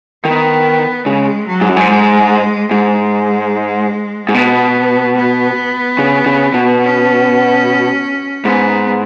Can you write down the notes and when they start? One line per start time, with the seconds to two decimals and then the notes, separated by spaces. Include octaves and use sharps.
0.25 D#3 B3
1.06 C#3 G#3
1.47 F#3
1.61 G#2
1.69 F#2
1.76 G#2
1.88 G#3
2.71 G#2 G#3
4.29 G#2
4.34 B2 B3
5.16 B3
5.99 C#3
6.26 C#3
6.54 B2
6.81 C#4
8.45 G#2 B3